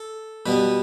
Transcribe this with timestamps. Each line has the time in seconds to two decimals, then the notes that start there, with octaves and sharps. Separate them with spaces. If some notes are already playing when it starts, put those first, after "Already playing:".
Already playing: A4
0.46 B2 G3 B3 B4